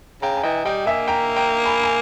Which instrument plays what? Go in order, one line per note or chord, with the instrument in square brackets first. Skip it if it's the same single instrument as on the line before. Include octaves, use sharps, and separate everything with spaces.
[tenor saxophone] C#3 [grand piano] G5 A#5
[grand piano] G#5
[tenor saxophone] E3 [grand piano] D#5 G5
[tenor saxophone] G3 [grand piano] D#5 G5
[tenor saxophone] A#3 [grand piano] E5 G#5
[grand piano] G5 A#5
G5 A#5
G#5 B5
G#5